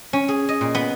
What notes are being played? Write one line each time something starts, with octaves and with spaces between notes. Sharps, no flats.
C#4
G#4
D#5
A#2
B3